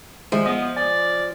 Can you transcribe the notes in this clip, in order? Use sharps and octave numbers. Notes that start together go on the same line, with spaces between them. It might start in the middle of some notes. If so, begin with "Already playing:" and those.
D#3 F3 G#3 E5
B3 D#5
D5 G#5